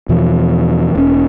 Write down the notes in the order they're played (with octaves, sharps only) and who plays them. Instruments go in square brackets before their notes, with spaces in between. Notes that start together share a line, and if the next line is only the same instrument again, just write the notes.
[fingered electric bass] E2 B2 E3 F3
E1 C#4